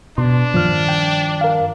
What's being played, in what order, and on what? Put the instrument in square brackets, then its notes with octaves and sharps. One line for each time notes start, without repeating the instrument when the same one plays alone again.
[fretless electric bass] B2 [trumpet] D4 [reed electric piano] C6
[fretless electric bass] G2 D#3 F3 [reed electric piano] A#2 F6
[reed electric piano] G5
A#4 F5